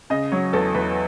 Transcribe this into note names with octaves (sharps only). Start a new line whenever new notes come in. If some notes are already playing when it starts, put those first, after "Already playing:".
C#3 D#5
F#3 C#5
E2 A4
E2 B4